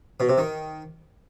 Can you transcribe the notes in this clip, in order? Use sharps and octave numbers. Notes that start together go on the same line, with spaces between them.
B2
C3
D#3